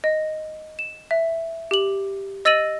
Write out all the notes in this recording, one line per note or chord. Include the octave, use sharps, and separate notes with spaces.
D#5
E7
E5
G4 F#7
D#5 E6 A6 A#6 D#7 F#7